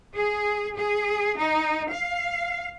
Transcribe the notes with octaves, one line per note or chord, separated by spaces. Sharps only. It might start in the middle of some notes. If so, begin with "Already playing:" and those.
G#4
G#4
D#4
F5